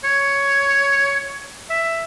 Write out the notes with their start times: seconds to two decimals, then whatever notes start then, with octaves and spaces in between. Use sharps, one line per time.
0.04 C#5
1.70 E5